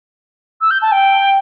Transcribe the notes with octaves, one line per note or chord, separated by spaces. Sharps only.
E6
G6
A5
G5